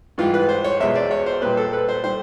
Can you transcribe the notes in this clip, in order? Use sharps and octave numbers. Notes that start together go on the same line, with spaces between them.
G#2 E3 G3 F4
B4
C5
C#5
E2 B2 G#3 E5
D5
C#5
C5
A#2 G3 B4
A4
B4
C5
D#3 G3 C5